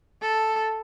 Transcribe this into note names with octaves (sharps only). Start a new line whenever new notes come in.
A4